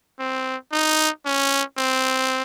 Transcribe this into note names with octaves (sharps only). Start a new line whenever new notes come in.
C4
D#4
C#4
C4